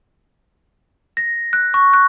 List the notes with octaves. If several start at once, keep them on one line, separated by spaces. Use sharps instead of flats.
A#6
F#6
C#6
F#6